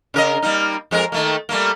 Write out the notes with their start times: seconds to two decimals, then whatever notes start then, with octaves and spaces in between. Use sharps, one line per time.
0.14 C#3 A#4 D#5
0.42 G3 A#3 D#4
0.91 F2 G#3 A#4
1.12 D#3 A3 A#3
1.49 G3 A3 A#3